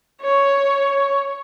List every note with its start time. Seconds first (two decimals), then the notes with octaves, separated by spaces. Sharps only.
0.22 C#5